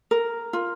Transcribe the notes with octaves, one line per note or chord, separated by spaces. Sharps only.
A#4
F4